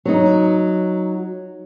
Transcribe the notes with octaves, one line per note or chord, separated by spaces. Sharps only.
F#3 D#4